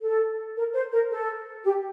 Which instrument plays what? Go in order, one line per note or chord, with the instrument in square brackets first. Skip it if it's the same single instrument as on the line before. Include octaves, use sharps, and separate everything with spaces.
[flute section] A4
A#4
C5
A#4
A4
G4